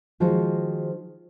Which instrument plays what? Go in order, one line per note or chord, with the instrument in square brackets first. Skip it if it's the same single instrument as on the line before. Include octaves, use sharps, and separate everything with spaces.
[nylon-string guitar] D#3 F3 G#3 F#4 C5